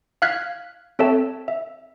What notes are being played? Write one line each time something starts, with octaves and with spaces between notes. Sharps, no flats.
F5 F6 F#6 G#6 B6
C4 A4 C#5 E5 A5
E5